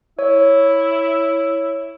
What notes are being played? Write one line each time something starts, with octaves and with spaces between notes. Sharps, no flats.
E4 C#5